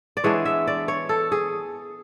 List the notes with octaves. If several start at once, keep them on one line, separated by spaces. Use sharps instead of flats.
D5
E3 G#3 B3 D4 C#5
E5
D5
C#5
A4
G#4